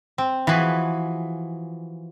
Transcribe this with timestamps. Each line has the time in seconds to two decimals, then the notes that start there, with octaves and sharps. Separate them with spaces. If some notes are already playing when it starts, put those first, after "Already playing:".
0.18 C4
0.47 E3 F3 F#4 G#4 B4